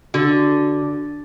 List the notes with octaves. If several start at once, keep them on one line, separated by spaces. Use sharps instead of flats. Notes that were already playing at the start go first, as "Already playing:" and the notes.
D3 F#4